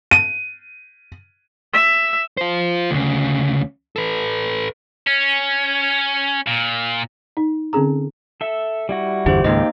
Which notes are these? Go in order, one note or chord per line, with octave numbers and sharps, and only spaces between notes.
D#7
E5
F4 C5
D2 C#3
A4 B4
C#4
A#2
D#4
D3 C4 C#4 G#4 A#5
A4 E5
G3 E4 F#4
G1 E2 D3 G4 C5
C#2 G#2 D#3 A#3 D#4 G4 D#5